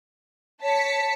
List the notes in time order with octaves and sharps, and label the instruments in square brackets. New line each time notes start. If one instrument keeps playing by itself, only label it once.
[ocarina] C#5 [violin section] A5 B6 C#7